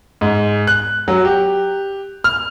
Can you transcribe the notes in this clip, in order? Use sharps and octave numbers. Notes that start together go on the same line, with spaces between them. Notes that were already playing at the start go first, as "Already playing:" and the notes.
G#2
F#6
F#3
G4
F6